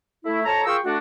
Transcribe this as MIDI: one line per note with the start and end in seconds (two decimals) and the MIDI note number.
0.25 0.41 57
0.25 0.41 64
0.45 0.63 41
0.45 0.63 73
0.45 0.63 81
0.45 0.63 82
0.65 0.77 65
0.65 0.77 68
0.65 0.77 70
0.65 0.77 79
0.65 0.77 85
0.65 0.77 88
0.84 0.97 57
0.84 0.97 62
0.84 0.97 66